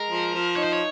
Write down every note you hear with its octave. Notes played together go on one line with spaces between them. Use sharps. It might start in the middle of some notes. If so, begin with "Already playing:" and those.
Already playing: G#3 A#4
F3
F3
D#4 C#5
C5
C#5